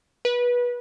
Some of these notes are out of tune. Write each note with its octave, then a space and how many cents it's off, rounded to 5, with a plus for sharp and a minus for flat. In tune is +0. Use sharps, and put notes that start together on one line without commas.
B4 -20